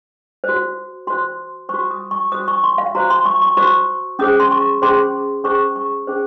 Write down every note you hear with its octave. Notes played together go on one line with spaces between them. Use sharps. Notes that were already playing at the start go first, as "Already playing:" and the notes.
F#4 C5
F#4 C5 C6
F#4 C5 C#6
D#6
C#6
F#4 C5 D#6
C#6
C6
F5
F#4 C5 A#5
C6
C#6
C#6
F#4 C5 C#6
C#4 G#4 C5 D#6
C6
C#6
C#4 G#4 C5 C6
C#4 G#4 C5 C#6
C#6
C#4 G#4 C5